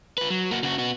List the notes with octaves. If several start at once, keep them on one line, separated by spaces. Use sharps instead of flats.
F4 B4
F#3
A#3 F#4
C#3 F#4
B3 F#4